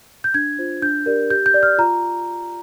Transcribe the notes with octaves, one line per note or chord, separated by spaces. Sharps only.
G6
D4 G#6
F4 C5
D4 G6
G4 A#4 D5
G4 G6
G6
D5
F6
F4 A#5